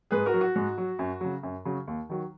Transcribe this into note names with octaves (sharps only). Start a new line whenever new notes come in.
G#2 G#4 B4
F#4 A#4
F#3
F#4
G#2
F#3
F#2
C#3 F#3
F#2
C#3 F#3
D#2
D#3 F#3